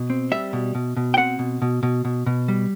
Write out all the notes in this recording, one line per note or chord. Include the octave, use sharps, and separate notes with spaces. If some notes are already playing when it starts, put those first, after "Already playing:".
Already playing: B2
C4
G3 E5
B2
B2
B2
G5
C4 F#5
B2
B2
B2
B2
B2
G3